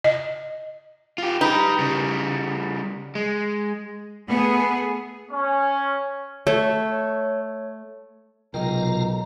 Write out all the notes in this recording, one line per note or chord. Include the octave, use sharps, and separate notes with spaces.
D#5
F4 G4
D#4 G4 B4
C#3 G3
G#3
A3 B3 G#4
C#4
A3 C#5
B1 G#2 C3 F4 A#4 D#5 G5 A#5